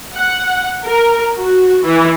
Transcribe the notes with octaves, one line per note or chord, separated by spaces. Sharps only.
F#5
A#4
F#4
E3